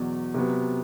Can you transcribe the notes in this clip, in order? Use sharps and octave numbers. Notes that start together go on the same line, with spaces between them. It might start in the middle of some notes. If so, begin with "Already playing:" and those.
Already playing: E2 B2 F#3
C3 F#3 B3